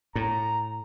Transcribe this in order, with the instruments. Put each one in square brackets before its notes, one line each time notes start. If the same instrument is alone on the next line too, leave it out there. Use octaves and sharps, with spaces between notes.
[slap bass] A2 [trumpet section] A#5